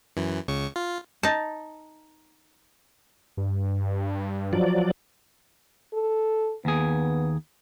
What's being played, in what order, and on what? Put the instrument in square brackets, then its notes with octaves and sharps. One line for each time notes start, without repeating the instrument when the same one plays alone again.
[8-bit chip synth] F#2 E3
C#2 C#3 C#6
F4
[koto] D#4 A5
[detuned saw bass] G2
[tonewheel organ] F3 F#3 D5
[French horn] A4
[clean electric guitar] D#2 G#4 [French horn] B3